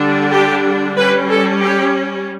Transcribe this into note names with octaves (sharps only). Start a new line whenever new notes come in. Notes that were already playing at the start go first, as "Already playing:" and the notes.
Already playing: D3 G3 D4
G4
G3 C#4 B4
A4
G4